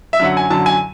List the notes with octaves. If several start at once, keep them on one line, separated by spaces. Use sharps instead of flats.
E5
F#2 D3 F#3 F#5
G#5
F#2 D3 F#3 A5
G#5